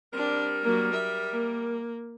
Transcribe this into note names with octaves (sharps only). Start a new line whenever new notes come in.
G3 C4 D4 A#4
F#3 A#3
E5
A#3